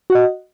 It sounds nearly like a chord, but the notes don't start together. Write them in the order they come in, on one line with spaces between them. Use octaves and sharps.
F#4 F#5 D#5